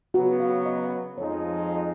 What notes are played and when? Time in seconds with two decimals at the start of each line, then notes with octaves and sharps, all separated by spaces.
0.14 C#3 F#3 B3 F#4
0.40 F5
0.66 D#5
1.17 F2 F3 G#3 D#4 C#5